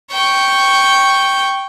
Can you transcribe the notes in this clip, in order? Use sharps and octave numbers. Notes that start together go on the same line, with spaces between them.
G5 C#6